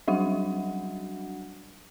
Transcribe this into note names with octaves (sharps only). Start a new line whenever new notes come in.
F#3 G3 D4 F#4 F#5